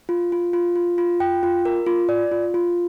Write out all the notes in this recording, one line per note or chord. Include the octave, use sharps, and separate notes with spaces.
F4
F4
F4
F4
F4
G5
F4
A#4
F4
D5
F4
F4